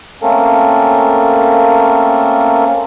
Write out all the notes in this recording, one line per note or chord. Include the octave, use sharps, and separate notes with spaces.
A3 A#3 C4 C#4 A4 A#4